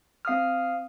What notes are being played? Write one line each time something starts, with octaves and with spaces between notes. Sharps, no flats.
C4 F5 D#6 F6